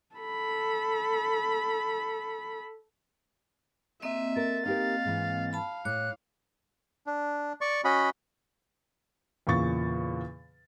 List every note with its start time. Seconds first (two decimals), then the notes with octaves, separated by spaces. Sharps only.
0.16 A4 B5
4.02 A#3 C4 D#5 E5
4.36 A4 A#4 A6
4.66 D#4 G4 A#4 F5
5.05 G#2 E3
5.53 F5 A5 B5
5.85 A2 C#5 D6 F#6
7.07 D4
7.61 D5 C#6
7.85 C#4 F#4 D#5 B5
9.47 E2 A#2 C#3 C#6 A6